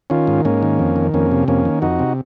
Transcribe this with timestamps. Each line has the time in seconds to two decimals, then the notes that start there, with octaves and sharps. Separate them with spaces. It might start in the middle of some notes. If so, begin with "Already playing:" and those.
0.10 D#3 C#4 F4
0.27 G#2
0.45 G#2 A#3 C#4
0.63 D#3
0.79 F2
0.96 D#3
1.14 F2 A#3 C#4
1.31 C3
1.48 F2 A#3 C#4
1.65 D#3
1.82 F2 D#4 F#4
1.99 C3